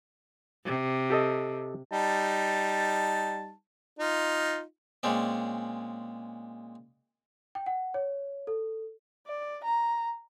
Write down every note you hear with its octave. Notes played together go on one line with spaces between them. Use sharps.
C3
G4 A4 D#5
G3 D#4 A5
D#4 F4
A#2 G#3 C4 C#4 D5
G5
F#5
C#5
A4
D5
A#5